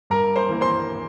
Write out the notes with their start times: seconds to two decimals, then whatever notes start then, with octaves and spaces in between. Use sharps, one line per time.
0.10 G2 A#4 A#5
0.36 C5 C6
0.49 E3 A#3
0.61 C5 C6